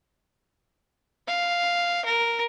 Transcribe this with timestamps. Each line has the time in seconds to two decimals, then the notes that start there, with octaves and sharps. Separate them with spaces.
1.28 F5
2.05 A#4